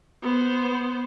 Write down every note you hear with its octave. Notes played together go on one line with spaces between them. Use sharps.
B3 C5